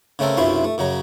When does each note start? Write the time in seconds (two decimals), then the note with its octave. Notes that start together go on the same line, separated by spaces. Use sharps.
0.19 C#3 A3 C4 A4 A#4
0.37 B1 F#2 C3 E4 F4 C6
0.64 A3
0.78 F#2 C#3 F#3 A#5